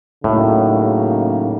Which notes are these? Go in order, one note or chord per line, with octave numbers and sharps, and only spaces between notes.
A2 C#3 F#3 A#3 D#4